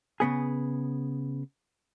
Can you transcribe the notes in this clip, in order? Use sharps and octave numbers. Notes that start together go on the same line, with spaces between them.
C#3 B3 G#4